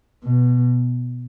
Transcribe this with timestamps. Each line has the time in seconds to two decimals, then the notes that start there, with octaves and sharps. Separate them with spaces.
0.24 B2